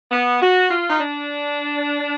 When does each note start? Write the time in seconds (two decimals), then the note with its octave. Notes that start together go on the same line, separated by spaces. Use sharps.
0.11 B3
0.40 F#4
0.69 F4
0.88 D#4
0.99 D4